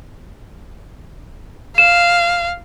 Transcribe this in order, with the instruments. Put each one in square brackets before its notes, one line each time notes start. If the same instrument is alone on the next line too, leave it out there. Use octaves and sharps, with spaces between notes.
[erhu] F5 [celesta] E7